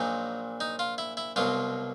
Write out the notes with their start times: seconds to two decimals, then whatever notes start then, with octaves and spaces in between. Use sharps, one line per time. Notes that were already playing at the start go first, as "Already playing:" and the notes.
Already playing: A#1 A#2 F#3 D#4
0.60 D#4
0.79 F4
0.98 E4
1.17 E4
1.36 C2 B2 F#3 F4